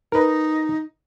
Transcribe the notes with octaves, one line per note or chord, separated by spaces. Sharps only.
D#4 A#4 B4